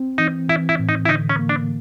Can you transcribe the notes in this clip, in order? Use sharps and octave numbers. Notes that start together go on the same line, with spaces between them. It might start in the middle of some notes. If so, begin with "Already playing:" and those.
Already playing: C4
E3 D#4
E3 E4
E4
A2
D#4
E4
D3 D#4
C#4
A#3
D4